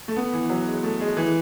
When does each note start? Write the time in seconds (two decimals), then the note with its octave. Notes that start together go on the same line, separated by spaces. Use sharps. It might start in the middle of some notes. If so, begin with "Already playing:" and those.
0.08 A3
0.17 B3
0.33 E3
0.50 F#3
0.67 G#3
0.83 A3
1.01 G#3
1.17 E3